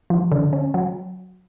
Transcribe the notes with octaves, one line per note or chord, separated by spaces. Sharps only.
F3
D3
C#4
F#3